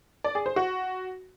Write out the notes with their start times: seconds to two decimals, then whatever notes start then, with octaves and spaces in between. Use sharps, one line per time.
0.24 D5
0.35 G#4
0.46 C5
0.56 F#4